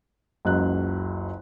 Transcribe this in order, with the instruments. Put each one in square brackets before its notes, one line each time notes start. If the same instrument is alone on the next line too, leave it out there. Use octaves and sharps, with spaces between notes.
[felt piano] F#1 C#2 F#3 F#6